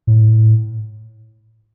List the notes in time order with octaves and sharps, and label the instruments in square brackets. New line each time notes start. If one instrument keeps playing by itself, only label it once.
[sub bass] A2